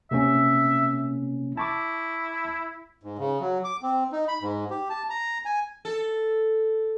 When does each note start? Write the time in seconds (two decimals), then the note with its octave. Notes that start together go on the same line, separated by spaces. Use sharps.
0.11 C3 A#3 C#4 E5
1.57 E4 A5 C#6 D6
3.03 G#2
3.19 C#3
3.40 F#3
3.64 D6
3.83 C4
4.12 D#4
4.28 B5
4.42 G#2
4.70 G4
4.90 A5
5.10 A#5
5.45 G#5
5.85 A4